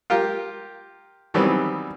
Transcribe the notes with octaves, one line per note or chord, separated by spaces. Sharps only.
F4 G4 A#4
D#3 E3 F#3 G3 B3 C4